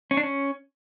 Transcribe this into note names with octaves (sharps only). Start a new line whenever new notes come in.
C#4
D4
C#4